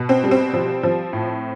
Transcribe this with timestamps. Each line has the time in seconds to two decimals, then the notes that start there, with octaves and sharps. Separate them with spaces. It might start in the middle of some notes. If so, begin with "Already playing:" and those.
Already playing: B2
0.09 C4
0.24 G3
0.31 C4
0.53 F3
0.83 F3
1.13 A2